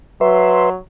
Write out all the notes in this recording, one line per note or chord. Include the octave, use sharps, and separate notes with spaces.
F#3 B4 E5 C6